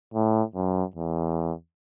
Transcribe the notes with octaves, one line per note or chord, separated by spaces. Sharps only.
A2
F#2
E2